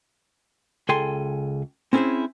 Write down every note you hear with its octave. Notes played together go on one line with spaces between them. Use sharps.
C#2 G#4 A4 G5 G#5 C6
C4 C#4 E4 G4 G#4 C5